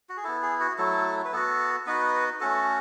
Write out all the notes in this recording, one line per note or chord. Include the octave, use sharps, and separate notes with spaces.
F#4
G#4
B3 E4 A4
G#4
F#4
F#3 A3 E4 A4
B4
B3 F#4 A4
B3 D#4 F#4 B4
A3 C#4 F#4 A4